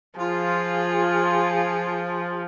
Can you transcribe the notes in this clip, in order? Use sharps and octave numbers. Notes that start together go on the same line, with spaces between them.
F3 F4 G#4